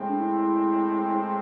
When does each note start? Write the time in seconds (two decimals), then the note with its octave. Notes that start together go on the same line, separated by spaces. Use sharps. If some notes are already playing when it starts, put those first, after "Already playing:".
Already playing: A2 G#3 C4
0.09 D4
0.20 E4